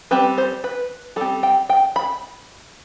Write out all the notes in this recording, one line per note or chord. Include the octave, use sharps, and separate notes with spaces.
G3 C4 B4
C5
B4
G3 C4 A4
G5
G5
B5